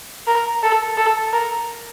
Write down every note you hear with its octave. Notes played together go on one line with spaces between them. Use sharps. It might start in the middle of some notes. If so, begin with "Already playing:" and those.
A#4
A4
A4
A#4